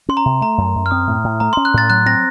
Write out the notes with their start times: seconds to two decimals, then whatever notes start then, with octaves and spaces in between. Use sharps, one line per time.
0.09 C#4 C6
0.17 A#5
0.26 C3
0.41 A3 A#5
0.58 F#2
0.75 F#2
0.86 F6
0.91 C4 D#6
1.07 A2
1.24 A2
1.40 A3 A#5
1.53 C#4 C6
1.65 F#6
1.74 A2 A6
1.90 F#3 F#6
2.06 C4 A#6